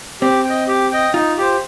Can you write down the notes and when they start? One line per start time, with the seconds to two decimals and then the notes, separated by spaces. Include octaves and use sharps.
0.21 C4 G4
0.45 G5
0.50 D#5
0.68 G4
0.92 D#5 G5
1.14 D#4 F4
1.38 G4 C5